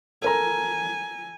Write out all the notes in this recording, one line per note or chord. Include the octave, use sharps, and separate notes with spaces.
A4 A#4 G#5 A#5